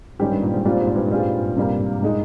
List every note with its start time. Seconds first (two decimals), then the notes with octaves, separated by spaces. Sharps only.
0.20 G#2 D#3 G3 C#4 G4
0.31 G2
0.42 A#2
0.54 G#2
0.65 A#2 G3 C4 F4
0.81 G#2
0.96 G2
1.11 G3 C4 F4 G#4
1.56 C3 G3 A#3
2.03 A#2 G#3 D#4